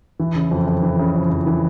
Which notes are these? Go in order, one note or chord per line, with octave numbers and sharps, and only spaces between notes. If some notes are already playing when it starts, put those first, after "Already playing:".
E3
C#3
F2
F2
E3
C#3
F2
F2
E3